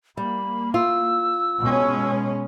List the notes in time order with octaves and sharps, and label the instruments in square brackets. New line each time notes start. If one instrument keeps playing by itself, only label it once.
[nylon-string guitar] G3 [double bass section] A#3 [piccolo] B5
[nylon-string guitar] F4 [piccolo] E6
[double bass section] B2 G#3 C#4